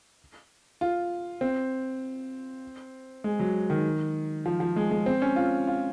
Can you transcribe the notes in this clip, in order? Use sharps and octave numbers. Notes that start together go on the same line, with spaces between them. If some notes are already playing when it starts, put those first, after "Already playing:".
F4
C4
G#3
F#3
D#3
F3
F3
G#3
G#3
C4
C#4
F4
F4